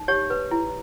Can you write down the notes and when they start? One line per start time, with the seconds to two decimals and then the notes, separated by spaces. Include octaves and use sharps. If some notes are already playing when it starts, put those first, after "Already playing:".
Already playing: D#4
0.08 G4 C#5
0.30 B4
0.51 E4